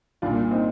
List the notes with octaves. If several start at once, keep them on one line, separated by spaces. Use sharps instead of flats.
C2 A#2 D4 F4
C4 D#4